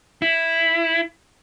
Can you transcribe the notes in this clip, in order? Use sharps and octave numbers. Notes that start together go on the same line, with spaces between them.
E4